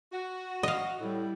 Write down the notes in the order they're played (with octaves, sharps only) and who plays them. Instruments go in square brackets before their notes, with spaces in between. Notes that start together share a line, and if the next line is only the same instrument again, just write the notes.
[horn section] F#4
[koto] D#5 F5
[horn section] A2 [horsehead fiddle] G3 E4